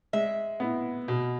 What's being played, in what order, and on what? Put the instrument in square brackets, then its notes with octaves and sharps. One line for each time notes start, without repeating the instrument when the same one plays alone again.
[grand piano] G#3 [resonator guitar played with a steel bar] E5
[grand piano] B3 E4
B2